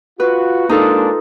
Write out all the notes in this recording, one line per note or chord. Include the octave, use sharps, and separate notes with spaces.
F4 F#4 B4
G#3 A#3 D4 D#4 F4 A4